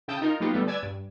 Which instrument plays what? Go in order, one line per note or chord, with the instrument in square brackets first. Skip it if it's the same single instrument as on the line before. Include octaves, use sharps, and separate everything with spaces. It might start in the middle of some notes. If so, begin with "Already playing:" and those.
[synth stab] C#3 E4 G5 A5 D#6 G6
D#4 F4 A#4
F#3 A#3 B3 D#4 F4 G4
D3 G3 A3 B3
B4 D5 G#5 D6 E6 G#6
G2